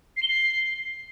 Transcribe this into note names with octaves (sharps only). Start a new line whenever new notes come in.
C7
G7
C7